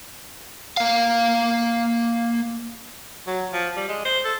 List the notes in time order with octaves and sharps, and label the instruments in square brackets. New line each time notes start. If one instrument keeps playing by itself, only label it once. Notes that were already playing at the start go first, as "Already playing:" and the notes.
[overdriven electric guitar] A#3 F5
[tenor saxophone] F#3
F3
G3
G#3
C5
A4